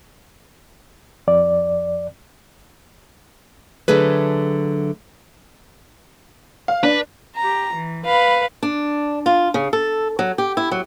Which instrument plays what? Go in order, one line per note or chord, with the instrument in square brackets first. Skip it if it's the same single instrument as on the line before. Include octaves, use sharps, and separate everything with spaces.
[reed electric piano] F2 D5
[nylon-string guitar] D3 F#3 A3 G#4 B4
[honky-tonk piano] F5
[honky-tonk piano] D4 [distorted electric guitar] B4
[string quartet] G4 A#5
E3
B4 F5 B5
[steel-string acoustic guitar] D4
F4
C#3
A4
F#3
G4
E4
F#3